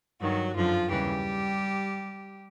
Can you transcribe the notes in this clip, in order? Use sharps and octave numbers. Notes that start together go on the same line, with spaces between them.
G2 D#3 F#3 F#4
F#2 D3 F3 F4
D#2 C#3 E3 G3 G4